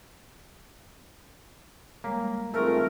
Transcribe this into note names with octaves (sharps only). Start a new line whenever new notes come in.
G3 G#3 A#3 C#5
G#2 E3 A3 C4 F4 A#4 C#6